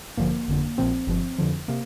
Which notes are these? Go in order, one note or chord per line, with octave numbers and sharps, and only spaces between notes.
A1 G2 D3 F3 A#3
G1 F2 D3
A#1 A#2 F3 C4
G1 G2 F3
F2 D3 F3
C3 A#3